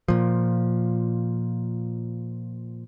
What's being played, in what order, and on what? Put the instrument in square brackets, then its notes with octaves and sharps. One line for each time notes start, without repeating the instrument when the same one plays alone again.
[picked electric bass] A#2 F3